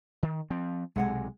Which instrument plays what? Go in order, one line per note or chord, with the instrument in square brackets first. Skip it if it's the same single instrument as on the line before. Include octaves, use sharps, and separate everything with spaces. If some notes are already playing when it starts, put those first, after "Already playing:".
[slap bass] D#3
F3 C4
[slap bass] B1 C3 [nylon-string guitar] G#3 F#5 G#5